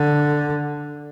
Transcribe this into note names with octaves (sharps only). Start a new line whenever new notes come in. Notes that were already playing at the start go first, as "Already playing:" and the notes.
Already playing: D3